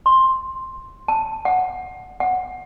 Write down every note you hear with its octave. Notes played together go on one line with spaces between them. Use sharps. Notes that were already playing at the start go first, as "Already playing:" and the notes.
C6
A5
F#5
F#5